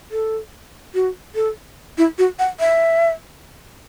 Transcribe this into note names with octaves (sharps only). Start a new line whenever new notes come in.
A4
F#4
A4
E4
F#4
F#5
E5